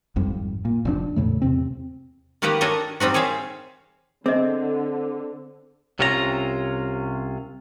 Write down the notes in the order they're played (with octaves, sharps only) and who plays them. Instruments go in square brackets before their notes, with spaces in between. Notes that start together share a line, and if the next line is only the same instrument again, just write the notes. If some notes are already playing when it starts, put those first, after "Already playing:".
[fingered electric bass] G#1 F2 G3
A#2
F1 F2 D4
E2 A2 C#3 A3
E2 C3 C4
[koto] D#3 A#3 F#4 G4 B4 A#5
D4 A4 A#4 C#5 D#5
G3 C4 D#4 F#4
G#4 C5 C#5 E5 F5
[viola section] D3 [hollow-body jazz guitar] C4 [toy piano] G#4 D#5
[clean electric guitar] C2 C3 C#4 F4 B4 A#5